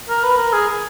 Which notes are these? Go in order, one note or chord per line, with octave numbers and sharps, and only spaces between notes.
A#4
B4
A#4
G#4